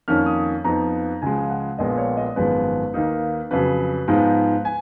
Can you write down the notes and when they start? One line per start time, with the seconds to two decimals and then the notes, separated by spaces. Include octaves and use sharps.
0.08 F2 D#3 A#3 C#4 F6
0.26 D#6
0.64 F2 F3 B3 D#4 A#5
1.22 C#2 C#3 F3 G#3 G#5
1.50 F#5
1.78 A#1 A#2 F3 G#3 B3 D#5
1.98 C#5
2.17 D#5
2.36 G#1 F#2 F3 G#3 B3 B4
2.94 D#2 D#3 A#3 D#4
3.51 F2 C#3 F#3 B4
4.08 G#2 F3 G#3 B3
4.65 G#5